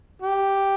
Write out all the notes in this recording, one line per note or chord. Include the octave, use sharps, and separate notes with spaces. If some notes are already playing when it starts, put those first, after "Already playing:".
G4